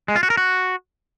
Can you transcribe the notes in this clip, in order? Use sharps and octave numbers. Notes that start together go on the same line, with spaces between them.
G#3
F4
F#4
A#4
F#4